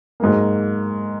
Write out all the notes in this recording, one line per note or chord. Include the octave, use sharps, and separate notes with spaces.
G#2 F#3 A#3